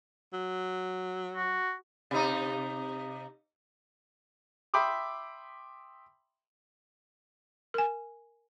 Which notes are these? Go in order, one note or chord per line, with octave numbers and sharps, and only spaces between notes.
F#3
F#4
C3 D#4
E5 G5 B5 C6 D6 D#6
A#4 G#5